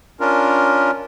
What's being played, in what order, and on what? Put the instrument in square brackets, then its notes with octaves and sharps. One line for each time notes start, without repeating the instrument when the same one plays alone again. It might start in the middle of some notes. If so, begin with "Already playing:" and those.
[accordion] C#4 D4 F4 A#4